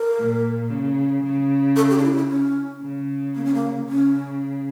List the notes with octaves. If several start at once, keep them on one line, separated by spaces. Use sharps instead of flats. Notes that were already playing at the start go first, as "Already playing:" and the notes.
Already playing: A#4
A#2
C#3
C#3
A4
G4
D4
E4
F4
E4
C#4
C#3
A#3
C#4
A#3
C#3 C#4